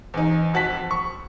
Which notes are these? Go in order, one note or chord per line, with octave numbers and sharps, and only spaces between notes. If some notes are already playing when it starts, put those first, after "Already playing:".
E2 D#4
F2 F#4 A5 B6
C#6